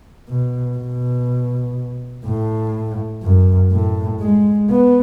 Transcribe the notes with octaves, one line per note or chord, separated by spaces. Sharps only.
B2
B2
A2
F#2
A2
G#3
B3